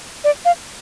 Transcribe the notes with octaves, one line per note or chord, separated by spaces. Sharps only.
D5
F5